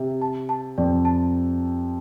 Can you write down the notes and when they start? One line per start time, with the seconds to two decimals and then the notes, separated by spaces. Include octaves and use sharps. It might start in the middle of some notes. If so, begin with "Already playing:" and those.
Already playing: C3
0.21 A5
0.49 A5
0.78 F2 D5
1.05 A5